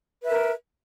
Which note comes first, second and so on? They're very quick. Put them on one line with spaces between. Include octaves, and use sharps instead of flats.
B4 E5 A#4